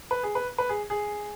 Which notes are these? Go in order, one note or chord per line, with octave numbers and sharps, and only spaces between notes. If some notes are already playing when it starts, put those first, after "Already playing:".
B4
G#4
B4
B4
G#4
G#4